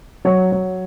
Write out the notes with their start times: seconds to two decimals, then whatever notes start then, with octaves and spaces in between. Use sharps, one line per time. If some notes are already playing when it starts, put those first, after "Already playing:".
0.25 F#3 C#5
0.52 F#3